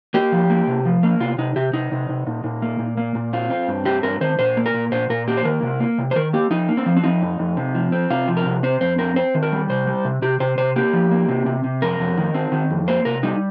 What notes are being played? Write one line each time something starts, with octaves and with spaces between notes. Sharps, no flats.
A#3 G4
F3
A#3
C3
F3
A#3
C3 F4
C3 D#4
C3 G4
C3 D#4
C3
C3
A#2
A#2
A#3
A#2
A#3
A#2
C4 F4
C4
G2
C4 G4
G2 A#4
D#3 C5
A#2 C5
A#3
A#4
A#2
A#2 C5
A#2 A#4
A#3 G4
C5
D#3 A#4
C3
A#3
C3
C5
D#3 A#4
A#3 G4
F3 D#4
A#3
C4
F3
C4
F3 D#4
F2
F2
C3
F3
C4
C3 F4
F3
A#4
C3
C4 C5
F2 C5
C4 A#4
C4 C5
D#3
A#4
G3
C3 C5
G3
C3
C3 G4
C3 C5
C3 C5
A#3 G4
F3
A#3
C3
C3
C3
F2 A#4
F2
D#3
C4
D#3
F2
A#3 C5
C3 A#4
G3 D#4